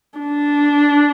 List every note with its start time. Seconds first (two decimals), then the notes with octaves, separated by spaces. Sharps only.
0.19 D4